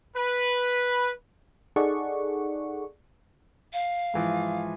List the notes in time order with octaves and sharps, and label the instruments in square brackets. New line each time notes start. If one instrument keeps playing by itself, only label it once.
[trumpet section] B4
[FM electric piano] D#4 G#4 A4 D5 F#5 C#6
[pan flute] F5
[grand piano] G#2 E3 F3